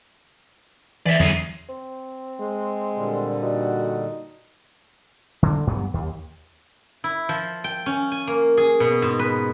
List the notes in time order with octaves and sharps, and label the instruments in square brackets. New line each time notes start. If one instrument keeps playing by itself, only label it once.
[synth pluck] E3 B6 [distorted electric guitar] D5 E5
[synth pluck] E2 D3 [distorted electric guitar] F#3 G#4
[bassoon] C4
[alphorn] G#3
[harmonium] A#2 D3 G3
[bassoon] D#4 [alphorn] F#4
[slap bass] D3
G2 F#3 B3
D#2
[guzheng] E4
F3
G5
C#4
G#5
A#3
G#4
B2
G#2
B4